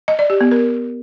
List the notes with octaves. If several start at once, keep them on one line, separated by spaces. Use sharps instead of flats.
D#5
D5
G4
B3
A#4